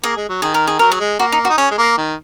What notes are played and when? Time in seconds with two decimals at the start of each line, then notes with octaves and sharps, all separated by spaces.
0.04 A#3 G#4
0.16 G#3
0.29 F#3
0.42 D#3 G#4
0.54 A#4
0.67 G#4
0.79 F#3 A#4
0.92 G#4
1.00 G#3
1.19 A#3 F#4
1.32 D#4
1.45 F#4
1.49 D#4
1.58 C#4 G#4
1.71 G#3
1.78 A#3
1.97 D#3